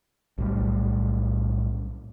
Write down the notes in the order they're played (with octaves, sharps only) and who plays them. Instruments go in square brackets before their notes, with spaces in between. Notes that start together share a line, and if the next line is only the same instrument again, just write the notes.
[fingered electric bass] B1 A2 G3